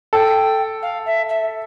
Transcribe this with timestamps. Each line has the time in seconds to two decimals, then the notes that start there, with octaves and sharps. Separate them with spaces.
0.13 A4 G5
0.82 F5
1.06 E5
1.29 E5